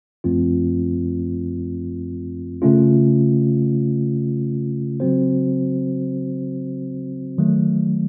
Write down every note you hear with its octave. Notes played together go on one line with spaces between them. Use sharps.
F#2 F3 A3 C4 F4
C#3 A3 C#4 F4
C#3 F#3 C4 F#4 C5
D#3 F#3 A3